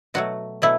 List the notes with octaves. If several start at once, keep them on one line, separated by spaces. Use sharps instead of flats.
B2 F#3 A3 F#4
B2 F#3 A3 E4